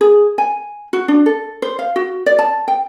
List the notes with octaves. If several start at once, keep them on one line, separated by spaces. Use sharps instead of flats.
G#4
G#5
F#4
D4
A4
C5
F5
F#4
D5
A5
G5